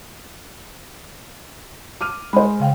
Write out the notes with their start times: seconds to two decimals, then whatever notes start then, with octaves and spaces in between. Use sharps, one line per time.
2.01 D6 F6 D#7
2.33 G#3 C5 D#5 B5
2.60 C#3 F5 G5